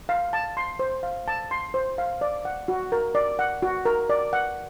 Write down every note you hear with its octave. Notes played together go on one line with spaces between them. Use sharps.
F5
A5
C6
C5
F5
A5
C6
C5
F5
D5
F#5
F#4
A#4
D5
F#5
F#4
A#4
D5
F#5